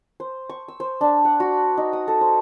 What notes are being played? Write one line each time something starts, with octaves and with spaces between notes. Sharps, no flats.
C5
C#6
E6
C5
D4
F#5
F#4
D#4
D#6
A4
C5